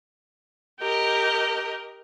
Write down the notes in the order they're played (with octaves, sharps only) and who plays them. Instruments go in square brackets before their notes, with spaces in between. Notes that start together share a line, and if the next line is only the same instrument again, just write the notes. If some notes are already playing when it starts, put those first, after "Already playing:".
[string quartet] G4 A#4 D#5